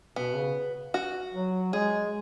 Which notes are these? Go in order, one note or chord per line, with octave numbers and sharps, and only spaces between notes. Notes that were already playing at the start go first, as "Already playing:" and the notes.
B2 B3
C#3
F#4
F#3
G#3 G#4